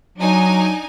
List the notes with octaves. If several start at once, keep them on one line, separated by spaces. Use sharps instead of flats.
F#3 D4 D#4 G#5